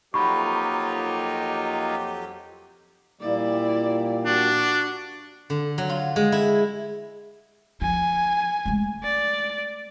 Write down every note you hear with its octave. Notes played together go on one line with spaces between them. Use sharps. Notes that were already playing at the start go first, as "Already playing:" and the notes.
F2 F#3 A#3 D#4 F4 G4 B5 C#6
A#2 G3 A#3 E4 D5
D4 F#4
D3
F#3
F4
G#3
E4
F3 G#5
G#3 A3
D5